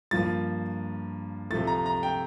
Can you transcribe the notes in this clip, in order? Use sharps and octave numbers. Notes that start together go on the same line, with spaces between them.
G2 F3 A#3 A6
C3 F3 A3 A6
A#5
A#5
G5